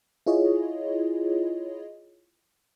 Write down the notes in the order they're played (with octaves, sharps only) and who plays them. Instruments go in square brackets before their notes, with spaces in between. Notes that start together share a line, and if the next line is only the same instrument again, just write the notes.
[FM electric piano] E4 F4 G#4 C#5 D#5